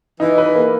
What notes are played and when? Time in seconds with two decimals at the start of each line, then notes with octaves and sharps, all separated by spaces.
0.20 E3 D#4
0.38 B4
0.55 A#3